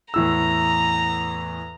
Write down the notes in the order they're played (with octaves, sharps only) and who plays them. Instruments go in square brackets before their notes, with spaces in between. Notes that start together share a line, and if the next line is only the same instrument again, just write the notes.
[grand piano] E2 A2 E6 [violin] A#5